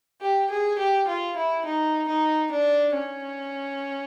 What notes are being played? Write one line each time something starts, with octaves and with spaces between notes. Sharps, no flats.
G4
G#4
G4
F4
E4
D#4
D#4
D4
C#4